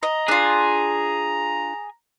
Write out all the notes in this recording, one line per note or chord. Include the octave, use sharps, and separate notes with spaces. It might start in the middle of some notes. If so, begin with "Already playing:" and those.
D#5 A#5
D4 F4 G#4